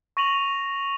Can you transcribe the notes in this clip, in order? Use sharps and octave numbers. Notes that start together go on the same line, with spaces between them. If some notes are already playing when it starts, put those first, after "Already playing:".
C#6 A#6 D#7 F7 F#7